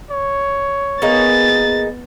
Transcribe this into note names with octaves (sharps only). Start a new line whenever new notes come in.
C#5
A#3 B3 D#4 G#4 A6